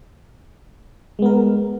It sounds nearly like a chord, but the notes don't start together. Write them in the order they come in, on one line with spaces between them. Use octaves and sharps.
G#3 B3 A#4